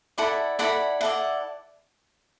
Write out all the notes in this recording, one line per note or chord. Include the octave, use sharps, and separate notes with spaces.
E4 A4 D5 F#5 B5
E4 A4 D5 F#5 B5
E4 A4 D5 F#5